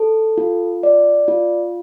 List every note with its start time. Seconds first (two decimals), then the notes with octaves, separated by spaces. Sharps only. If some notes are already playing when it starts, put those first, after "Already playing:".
Already playing: A4
0.38 F4
0.83 D5
1.28 F4